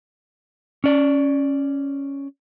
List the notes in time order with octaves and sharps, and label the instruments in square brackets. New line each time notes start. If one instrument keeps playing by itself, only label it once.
[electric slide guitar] C#4 D5